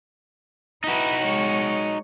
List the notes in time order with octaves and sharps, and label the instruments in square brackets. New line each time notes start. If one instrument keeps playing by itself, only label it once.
[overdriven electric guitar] D#4 F#4 [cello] E4 B4
[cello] G#3 C#5